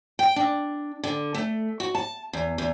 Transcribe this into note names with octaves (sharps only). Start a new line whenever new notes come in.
G5
D4
D3
A3
F#4
A5
E2
E2